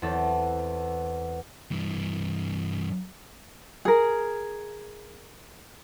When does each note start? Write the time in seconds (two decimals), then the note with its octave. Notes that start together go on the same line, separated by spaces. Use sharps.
0.02 E2 C4 A4
1.71 G2 E3
3.85 G#4 A#4